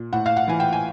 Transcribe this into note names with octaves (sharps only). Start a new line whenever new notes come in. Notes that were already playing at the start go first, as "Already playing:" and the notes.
Already playing: A#2
A2 F#5
F5
F#5
E3 G#5
G5
G#5